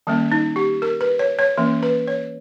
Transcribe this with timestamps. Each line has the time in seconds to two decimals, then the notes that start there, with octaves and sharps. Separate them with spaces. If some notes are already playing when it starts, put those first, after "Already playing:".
0.07 D#3 G3 A#3 C#4
0.32 D#4
0.56 G4
0.82 A#4
1.01 B4
1.19 C#5
1.39 C#5
1.57 E3 A#3 C#4
1.83 B4
2.08 C#5